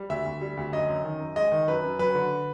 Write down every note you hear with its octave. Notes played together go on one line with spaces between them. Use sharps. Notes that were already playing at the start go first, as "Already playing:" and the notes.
Already playing: G3
D2 E5
D2
G3
D2
F#2 D#5
F#2
D#3
F#2
G#3 D#5
D#3
F#2 B4
F#2
F#3 B4
D3